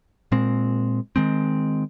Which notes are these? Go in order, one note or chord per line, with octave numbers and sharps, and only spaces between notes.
A#2 G#3 C4
D#3 G#3 C4